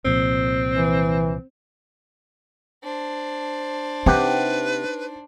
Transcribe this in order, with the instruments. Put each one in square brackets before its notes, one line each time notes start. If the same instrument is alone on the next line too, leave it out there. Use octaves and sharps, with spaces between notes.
[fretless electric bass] C2 A#2 F3 [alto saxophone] C4
[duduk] E3
[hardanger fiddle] D4 C5
[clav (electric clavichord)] C3 G4 F#5 [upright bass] D#4 [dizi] B4